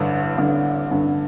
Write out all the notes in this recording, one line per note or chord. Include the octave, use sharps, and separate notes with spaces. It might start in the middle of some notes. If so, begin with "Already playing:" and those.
Already playing: A1 G2 D3
A1 G2 D3
A1 G2 D3